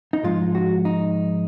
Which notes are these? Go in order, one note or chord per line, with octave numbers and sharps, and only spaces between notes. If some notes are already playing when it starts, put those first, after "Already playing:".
D#4
G#2 F3 G#3 F4
F#4
D#4